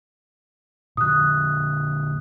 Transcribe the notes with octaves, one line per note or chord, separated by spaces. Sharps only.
A#2 D3 D#6 F#6